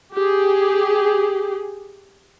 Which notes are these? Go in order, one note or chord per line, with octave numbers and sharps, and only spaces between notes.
G4 G#4